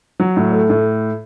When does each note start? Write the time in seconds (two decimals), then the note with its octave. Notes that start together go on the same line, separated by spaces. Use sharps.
0.20 F#3
0.37 A2
0.52 A3
0.70 A2